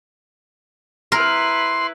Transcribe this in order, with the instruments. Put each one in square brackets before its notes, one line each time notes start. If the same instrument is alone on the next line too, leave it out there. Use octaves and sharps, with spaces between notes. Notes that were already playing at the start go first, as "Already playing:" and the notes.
[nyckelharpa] E4 B4 [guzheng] A#4 [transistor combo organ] C6